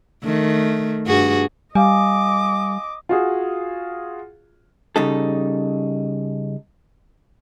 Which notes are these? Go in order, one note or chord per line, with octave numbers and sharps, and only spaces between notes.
D#3 A3
G2 F#4 G#4
G3 D#5 F5 G#5 D6
F4 F#4 G#4
C#3 G3 D#4 A4